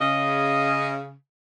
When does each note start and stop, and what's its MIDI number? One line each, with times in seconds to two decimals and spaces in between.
0.01 1.14 49
0.01 0.93 75